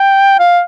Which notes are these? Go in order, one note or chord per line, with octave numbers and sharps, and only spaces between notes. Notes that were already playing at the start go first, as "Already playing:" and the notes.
Already playing: G5
F5